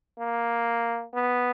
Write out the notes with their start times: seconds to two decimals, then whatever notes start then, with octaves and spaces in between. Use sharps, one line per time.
0.20 A#3
1.14 B3